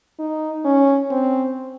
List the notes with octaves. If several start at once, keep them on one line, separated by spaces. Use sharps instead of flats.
D#4
C#4
C4